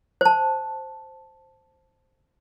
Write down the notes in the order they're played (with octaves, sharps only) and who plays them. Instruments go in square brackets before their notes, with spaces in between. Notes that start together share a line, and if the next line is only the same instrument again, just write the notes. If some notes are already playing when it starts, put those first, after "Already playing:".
[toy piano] C5 A5